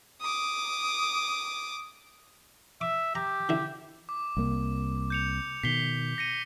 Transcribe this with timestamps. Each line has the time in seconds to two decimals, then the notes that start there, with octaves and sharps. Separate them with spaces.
0.22 D6 D#6
2.81 E5 D6
3.15 G4 A#5
3.49 D3 E4
4.09 D6
4.37 C2 A#3
5.10 G6 C#7 F7
5.63 B2 D#3 B6 C7 G7
6.18 A#6 C#7 D#7